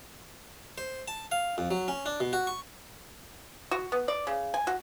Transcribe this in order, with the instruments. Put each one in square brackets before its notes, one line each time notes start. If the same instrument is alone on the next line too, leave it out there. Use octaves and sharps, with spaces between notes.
[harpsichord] C5
A5
F5
F2
F#3
C#4
D4
B2
F#4
C#6
[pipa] F#4
B3
D5
C#3
G#5
F#4